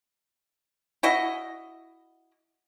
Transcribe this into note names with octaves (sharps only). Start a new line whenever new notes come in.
E4 F#4 D#5